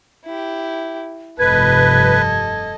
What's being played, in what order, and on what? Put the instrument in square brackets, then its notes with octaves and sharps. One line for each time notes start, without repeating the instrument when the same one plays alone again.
[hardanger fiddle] E4 G4
[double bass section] F1 G2 C3 [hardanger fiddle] A4 D#5 [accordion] B4 [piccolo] G#6